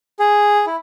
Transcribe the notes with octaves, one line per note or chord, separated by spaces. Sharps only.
G#4
E4